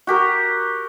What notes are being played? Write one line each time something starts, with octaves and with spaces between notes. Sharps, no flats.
F#4 G4 A#4